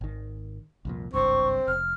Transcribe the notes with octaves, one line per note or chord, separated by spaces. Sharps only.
G#1 D#3
C2 F2 A#2
G#1 C#2 G2 C4 C#6
F1 F6